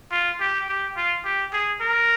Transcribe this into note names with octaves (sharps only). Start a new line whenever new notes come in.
F4
G4
G4
F4
G4
G#4
A#4